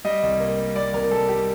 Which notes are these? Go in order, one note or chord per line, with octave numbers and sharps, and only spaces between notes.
G3 D#5
C2
A#3
G3
G3 D5
C2 A#4
G3 A4
G3 G4